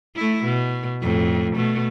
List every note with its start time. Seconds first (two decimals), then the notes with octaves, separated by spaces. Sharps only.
0.15 A3 E4
0.44 B2
1.02 F2 A2
1.56 B2 A3